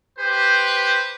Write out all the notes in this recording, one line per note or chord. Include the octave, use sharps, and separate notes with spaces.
G4 B4 C5